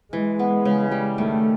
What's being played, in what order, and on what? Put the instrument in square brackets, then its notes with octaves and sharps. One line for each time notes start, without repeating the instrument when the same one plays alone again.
[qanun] E3 [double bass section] G#3
[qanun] B3
C#3
G3
[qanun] D#3 [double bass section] A3